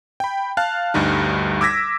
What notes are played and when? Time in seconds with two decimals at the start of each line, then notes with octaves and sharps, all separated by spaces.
0.20 G5 B5
0.57 F5 A5 F6 F#6
0.94 D2 G2 G3 D#4
1.61 D6 E6 G#6 A#6 B6